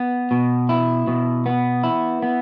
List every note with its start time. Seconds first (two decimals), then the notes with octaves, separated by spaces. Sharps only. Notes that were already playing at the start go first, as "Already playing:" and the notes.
Already playing: B3
0.31 B2
0.69 E4
1.07 B2
1.46 B3
1.84 E4
2.22 B3